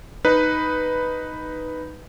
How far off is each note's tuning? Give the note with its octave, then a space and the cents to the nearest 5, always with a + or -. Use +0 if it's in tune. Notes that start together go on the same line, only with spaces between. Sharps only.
D#4 +0 B4 +0